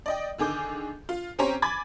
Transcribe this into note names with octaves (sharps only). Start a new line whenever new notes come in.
D5 D#5 G5
D3 D#3 G#4 D6 G6
F4
C4 C#4 G4 C5 C#5 A#5
G#5 B5 D6 G#6 A6